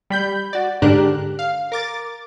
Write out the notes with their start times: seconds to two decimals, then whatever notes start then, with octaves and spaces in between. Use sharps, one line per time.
0.10 G3 B5 G6
0.53 F#4 D5
0.82 G#2 D3 D4 G4 A#4 F#6
1.39 F5
1.72 A#4 D6 A6